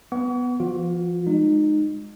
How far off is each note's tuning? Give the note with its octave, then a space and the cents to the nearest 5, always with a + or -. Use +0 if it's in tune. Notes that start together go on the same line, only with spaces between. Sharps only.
B3 +0 F#5 +15 C#6 +45
F3 -30 F4 +35
G#3 +0 D#4 -25